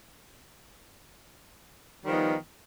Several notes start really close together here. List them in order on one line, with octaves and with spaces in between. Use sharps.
G3 D#3 F3 B3 D#4